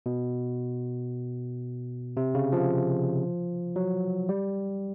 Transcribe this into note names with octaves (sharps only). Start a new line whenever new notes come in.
B2
C3
C#3
F3
F#3
G3